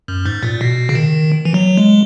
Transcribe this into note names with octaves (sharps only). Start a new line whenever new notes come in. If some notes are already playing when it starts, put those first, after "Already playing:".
F#2
G#2
A#2
B2
C#3
D#3
E3
F#3
G#3